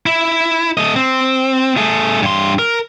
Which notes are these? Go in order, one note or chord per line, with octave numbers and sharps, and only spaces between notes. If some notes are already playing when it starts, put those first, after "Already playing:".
E4
A3 D#5
C4
A3 G#4
G2 C6
A#4